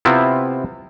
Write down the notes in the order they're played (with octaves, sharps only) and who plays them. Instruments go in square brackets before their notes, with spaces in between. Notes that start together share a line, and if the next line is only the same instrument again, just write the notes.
[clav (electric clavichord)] C3 B3 C4 E4 F4